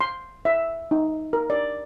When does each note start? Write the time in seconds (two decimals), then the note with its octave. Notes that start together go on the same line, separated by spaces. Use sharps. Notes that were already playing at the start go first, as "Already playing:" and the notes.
0.01 C6
0.45 E5
0.91 D#4
1.33 A#4
1.50 D5